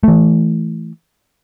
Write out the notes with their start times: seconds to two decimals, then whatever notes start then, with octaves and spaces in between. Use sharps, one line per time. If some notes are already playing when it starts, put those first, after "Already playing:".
0.03 E3 A3